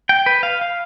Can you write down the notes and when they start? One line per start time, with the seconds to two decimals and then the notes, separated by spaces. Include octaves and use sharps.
0.09 G5
0.26 B4
0.43 F5
0.61 F5